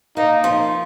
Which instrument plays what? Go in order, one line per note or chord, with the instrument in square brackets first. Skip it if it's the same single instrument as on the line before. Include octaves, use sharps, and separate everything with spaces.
[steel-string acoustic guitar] A#3 [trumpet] D#4
[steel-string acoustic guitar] F3